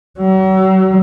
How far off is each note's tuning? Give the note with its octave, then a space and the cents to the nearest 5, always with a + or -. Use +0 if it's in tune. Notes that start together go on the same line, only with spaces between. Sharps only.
F#3 +40